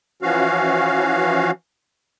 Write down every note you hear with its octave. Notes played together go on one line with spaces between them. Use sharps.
E3 F3 C#4 F#4 F5